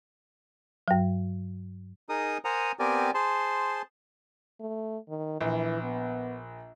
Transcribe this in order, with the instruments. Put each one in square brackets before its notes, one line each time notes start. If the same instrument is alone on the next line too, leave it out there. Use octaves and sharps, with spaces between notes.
[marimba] G2 F#3
[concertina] D#4 G#4 A#4 D#6
A#4 C5 F#5 G#5 A#5 D#6
B3 C4 G4 A#4 D5 G#5
G#4 C5 A5 C6
[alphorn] A3
D#3
[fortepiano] A#1 [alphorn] E3
[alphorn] B3